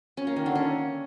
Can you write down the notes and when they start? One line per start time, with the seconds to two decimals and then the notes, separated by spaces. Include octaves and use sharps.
0.17 C#4
0.27 A#3
0.36 D#3
0.46 D3
0.55 C#4